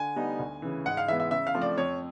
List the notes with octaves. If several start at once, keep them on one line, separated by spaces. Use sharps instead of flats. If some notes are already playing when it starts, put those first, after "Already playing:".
Already playing: D3 G#5
G3 B3 D#4
D2
C#3 E3
G#2 F#5
F5
E3 G#3 B3 E5
E5
C#3 E5
F5
F3 A3 C4
D5
F2 C#5